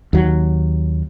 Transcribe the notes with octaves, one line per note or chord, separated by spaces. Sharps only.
D#2 F#3